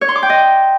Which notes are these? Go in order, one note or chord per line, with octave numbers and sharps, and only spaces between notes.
C#5
C6
D6
G5
D#5